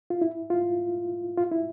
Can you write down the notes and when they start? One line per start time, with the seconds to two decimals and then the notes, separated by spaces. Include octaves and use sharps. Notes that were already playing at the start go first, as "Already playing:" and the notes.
0.10 F4
0.22 E4
0.50 F4
1.38 F4
1.51 E4